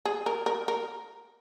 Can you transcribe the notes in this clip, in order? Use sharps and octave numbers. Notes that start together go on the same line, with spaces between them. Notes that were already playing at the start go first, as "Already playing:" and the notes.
G#4
A#4
A#4
A#4